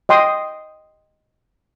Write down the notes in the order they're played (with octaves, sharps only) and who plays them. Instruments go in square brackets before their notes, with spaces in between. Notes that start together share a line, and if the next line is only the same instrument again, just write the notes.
[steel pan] D#5 G5 C6 D#6